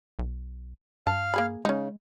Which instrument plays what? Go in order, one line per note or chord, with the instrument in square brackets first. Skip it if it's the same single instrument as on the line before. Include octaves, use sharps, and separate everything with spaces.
[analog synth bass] B1
[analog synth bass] G2 [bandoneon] F5 F6 [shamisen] A5
[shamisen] A#3 G#4 B5
[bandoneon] C#3 [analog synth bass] G#3 [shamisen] C#4 D#4